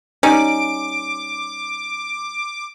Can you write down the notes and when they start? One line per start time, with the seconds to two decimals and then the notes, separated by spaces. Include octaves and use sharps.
0.23 G3 C#4 D#4 D6